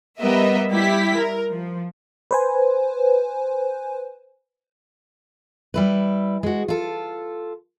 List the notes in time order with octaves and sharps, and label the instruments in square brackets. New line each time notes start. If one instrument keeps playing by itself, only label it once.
[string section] G3 B3 A#4 D#5 E5
G3 E4 G4 B6
A#4
F3
[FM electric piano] B4 C5 G#5
[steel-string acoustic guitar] G3 E4 B4
G#3 F#4
F4 A4